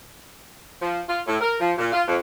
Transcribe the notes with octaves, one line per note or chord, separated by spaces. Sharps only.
F3
F4
A2
A#4
F3
A#2
F4
F2